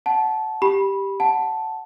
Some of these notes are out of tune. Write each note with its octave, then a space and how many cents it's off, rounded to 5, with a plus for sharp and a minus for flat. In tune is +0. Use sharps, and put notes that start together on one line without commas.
F#5 +0 A5 -15
G4 +0 B5 -15
F#5 +0 A5 +0